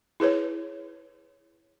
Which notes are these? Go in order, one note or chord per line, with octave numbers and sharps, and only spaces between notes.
E4 G#4 B4 C#5